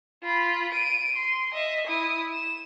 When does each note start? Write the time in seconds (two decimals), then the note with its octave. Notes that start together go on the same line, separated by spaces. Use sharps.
0.23 F4 B5
0.72 D7 D#7
1.16 C6
1.54 D#5 E5
1.87 E4 D#6
2.33 E7